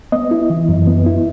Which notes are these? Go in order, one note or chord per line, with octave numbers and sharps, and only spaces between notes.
B3 D#5
E4
E3
F#2
B3
E4